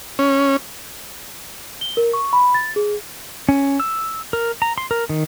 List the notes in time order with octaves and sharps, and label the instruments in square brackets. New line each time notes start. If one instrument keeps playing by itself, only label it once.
[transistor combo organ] C#4
[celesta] G7
A#4
C#6
B5
A6
G#4
[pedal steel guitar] C#4
E6
A#4
A#5
C6
A#4
D#3